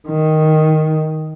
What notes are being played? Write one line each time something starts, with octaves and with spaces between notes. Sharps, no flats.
D#3